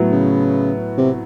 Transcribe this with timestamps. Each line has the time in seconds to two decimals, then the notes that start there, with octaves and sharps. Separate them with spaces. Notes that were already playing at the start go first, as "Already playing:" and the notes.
Already playing: A2 F#3 B3
0.12 C#3
0.98 C3